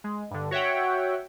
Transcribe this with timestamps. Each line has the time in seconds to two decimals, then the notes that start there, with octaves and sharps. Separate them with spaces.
0.04 G#3
0.31 G2 D3
0.51 F#4 C#5 E5 F#5 G5